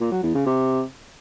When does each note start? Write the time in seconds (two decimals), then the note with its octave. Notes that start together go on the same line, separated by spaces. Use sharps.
0.01 A#2
0.12 F#3
0.23 E2
0.35 C#3
0.46 C3